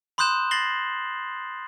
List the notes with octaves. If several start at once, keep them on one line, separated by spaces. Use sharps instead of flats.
B5 C6 D#6 F#6 G6 E7
A6 A#6 C7 F#7 G7